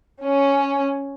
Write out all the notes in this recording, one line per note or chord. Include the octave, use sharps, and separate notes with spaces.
C#4